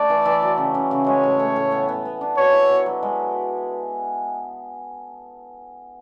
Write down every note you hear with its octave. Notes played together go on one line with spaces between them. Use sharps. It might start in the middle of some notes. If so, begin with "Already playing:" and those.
Already playing: A3 D4 D5
E3
E3
F#3
C#3
C#3
C#3
G#3 C#5
A2
A2
A2
B3
B3
B3
D4
B2 C#5
E4
B2
F#3
G#3